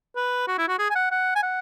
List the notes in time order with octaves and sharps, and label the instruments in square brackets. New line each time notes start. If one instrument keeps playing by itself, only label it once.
[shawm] B4
F#4
E4
F#4
G#4
G#5
F#5
F#5
G#5
F#5